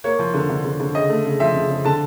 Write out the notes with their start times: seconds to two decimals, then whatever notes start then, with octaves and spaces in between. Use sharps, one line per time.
0.04 A#3 C#5
0.19 F3
0.34 D3
0.49 D3
0.64 D3
0.80 D3
0.95 C#3 D#5
1.09 A3
1.25 C#3
1.40 F3 E5
1.55 C#3
1.70 C#3
1.85 D3 A5